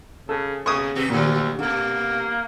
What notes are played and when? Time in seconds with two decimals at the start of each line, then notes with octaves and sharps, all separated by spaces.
0.29 C#3 A4
0.66 A#2 C#3 C#6 D#6
0.95 B2 G4 B4
1.10 D2 A#2 D3 F#3
1.59 G2 A#2 D3 A#3